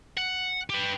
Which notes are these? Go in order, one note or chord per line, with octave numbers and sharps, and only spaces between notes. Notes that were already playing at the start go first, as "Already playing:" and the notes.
F#5
G4 B4